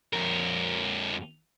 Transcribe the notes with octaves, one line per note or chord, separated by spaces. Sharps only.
F2 A#4